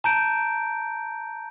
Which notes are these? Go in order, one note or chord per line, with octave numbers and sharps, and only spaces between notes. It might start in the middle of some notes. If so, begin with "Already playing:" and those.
A5 A#5 G6 D7